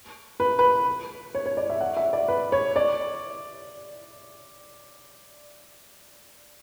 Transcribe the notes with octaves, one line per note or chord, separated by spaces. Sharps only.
B4
B4
C#5
C#5
D5
E5
F#5
E5
D5
B4
C#5
D5